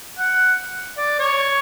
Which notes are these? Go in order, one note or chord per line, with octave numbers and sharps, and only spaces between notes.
F#5
D5
C#5